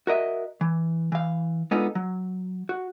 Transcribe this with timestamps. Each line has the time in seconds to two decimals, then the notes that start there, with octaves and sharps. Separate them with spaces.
0.07 F#4 A#4 D#5 E5
0.61 E3
1.12 E3 F5
1.71 G#3 B3 D4 D#4 F4 A4
1.95 F#3
2.69 F#4